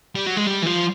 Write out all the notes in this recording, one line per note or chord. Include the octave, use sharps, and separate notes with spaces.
G3
F#3
G#3
G3
E3
F3